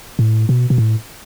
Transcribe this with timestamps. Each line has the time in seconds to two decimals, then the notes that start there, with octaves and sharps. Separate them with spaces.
0.19 A2
0.49 B2
0.70 B2
0.78 A2